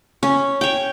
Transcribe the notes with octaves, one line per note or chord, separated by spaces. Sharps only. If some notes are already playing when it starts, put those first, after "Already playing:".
C#4
C#5 G5